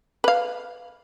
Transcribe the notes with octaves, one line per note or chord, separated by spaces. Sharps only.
B4 F5